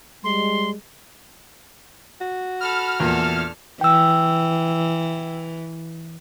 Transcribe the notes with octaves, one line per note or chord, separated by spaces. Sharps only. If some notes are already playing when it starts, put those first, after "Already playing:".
G3 G#3 C6
F#4
A4 B5 F6
E2 A#2 D4 A4
E3 G5 E6